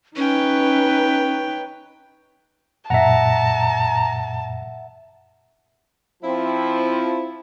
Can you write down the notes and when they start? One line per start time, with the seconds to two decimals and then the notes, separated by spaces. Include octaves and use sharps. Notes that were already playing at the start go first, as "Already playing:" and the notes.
0.16 C#4 D#4 B4 C#5 G5
2.90 F#2 A#2 E5 F#5 A5 A#5
6.23 F3 C4 E4